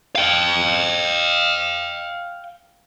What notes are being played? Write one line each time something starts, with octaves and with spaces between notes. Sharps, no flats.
F5 G5